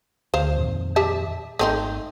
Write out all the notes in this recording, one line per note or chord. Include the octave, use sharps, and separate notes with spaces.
D2 C5 F5
F2 A#2 D#3
G4 E5 A5
G#1 A3 C4 D#4